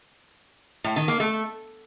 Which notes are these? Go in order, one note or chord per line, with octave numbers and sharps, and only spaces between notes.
A2
D#3
A#3
A3